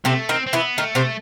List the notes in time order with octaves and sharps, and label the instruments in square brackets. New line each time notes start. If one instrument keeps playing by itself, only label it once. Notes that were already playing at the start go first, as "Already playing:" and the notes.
[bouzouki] C3 C4 [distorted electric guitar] A3
[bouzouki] D#3 D#4 [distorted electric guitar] C4
[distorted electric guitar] C4
[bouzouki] E3 E4 [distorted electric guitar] B3
[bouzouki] D#3 D#4 [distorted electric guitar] A3
[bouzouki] C3 C4